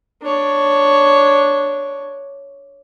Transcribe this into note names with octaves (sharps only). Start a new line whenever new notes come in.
D4 C#5